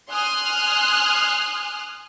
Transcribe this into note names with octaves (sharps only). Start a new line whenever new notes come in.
G#5 C6 D#6 F6 F#6